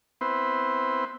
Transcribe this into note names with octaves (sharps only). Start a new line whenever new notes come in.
B3 C4 E4 B4 C5